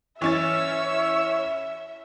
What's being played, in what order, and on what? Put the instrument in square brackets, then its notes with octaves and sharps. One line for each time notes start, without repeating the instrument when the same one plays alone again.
[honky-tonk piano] E3 C#4 A6 [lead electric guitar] C#5 [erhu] E5 [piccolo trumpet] E6